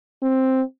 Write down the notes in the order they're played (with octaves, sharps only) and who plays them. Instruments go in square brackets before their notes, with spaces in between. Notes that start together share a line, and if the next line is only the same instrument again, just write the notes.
[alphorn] C4